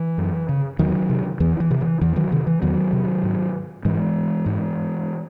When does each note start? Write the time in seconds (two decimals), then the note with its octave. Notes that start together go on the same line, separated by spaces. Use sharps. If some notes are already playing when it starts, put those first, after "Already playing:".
Already playing: E3
0.18 F#2
0.49 C#3
0.79 E2 D#3 F#3
1.10 C3
1.40 E2 E3
1.60 E3
1.71 C3
1.81 E3
2.01 E2 E3
2.16 D#3 F#3
2.32 C3 D#3
2.47 E3
2.62 E2 D#3 F#3
2.93 C3
3.23 G#2
3.85 G#2 E3 G#3
4.46 G#2